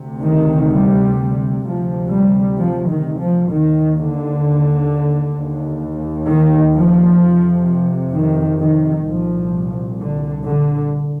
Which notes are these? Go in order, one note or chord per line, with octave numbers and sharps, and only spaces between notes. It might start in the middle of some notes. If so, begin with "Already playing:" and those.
Already playing: D2 C3
D#3
G3
D2 C3 F3
G3
F3
D#3
F3
D#2 D#3
D3
D#2
D#3
F3
F2 C3
D#3
D#3
C2 A#2 F3
D3
D3